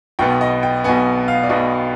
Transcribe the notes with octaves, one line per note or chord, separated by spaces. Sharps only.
B1 B2 B3 G5
D#5
G5
B1 B2 B3 G#5
F5
D5
B1 B2 B3 D#5